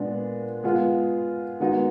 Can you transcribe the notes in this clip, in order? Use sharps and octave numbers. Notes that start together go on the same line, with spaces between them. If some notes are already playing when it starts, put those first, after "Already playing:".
Already playing: A#2 G#3 B3 D4
G#3 B3 F4 G#4
D#3 G#3 B3 D#4 F#4